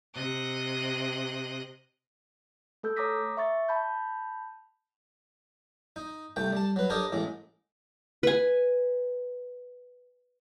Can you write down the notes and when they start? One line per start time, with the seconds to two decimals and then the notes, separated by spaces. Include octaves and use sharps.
0.14 C3 D#5 F#6
2.83 A3 A4 E6 G6
2.97 C#5 A#5 D6 D#6 A#6 B6
3.37 E5 C#6 A6
3.69 A5 B5 G6
5.96 D#4
6.36 C2 A3 G5
6.53 G3 A5
6.76 F#3 B4
6.90 D4 G4 A4 A#4 C#5 D#5
7.12 A1 A2 G#3
8.23 B4 G#5